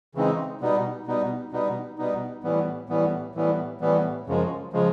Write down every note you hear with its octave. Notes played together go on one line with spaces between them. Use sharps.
C#3 E3 G#3 C4 D#4
B2 G3 B3 D#4
B2 G3 B3 D#4
B2 G3 B3 D#4
B2 G3 B3 D#4
A2 E3 G3 B3
A2 E3 G3 B3
A2 E3 G3 B3
A2 E3 G3 B3
F#2 C#3 F3 G#3
C#3 F3 G#3